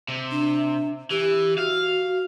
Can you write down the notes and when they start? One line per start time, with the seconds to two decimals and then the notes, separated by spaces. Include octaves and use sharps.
0.08 C3
0.31 D4
1.11 E3 G4
1.58 F#4 F5